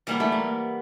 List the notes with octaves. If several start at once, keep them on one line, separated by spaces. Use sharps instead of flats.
E3 G3 A#3 B3
A3
A#3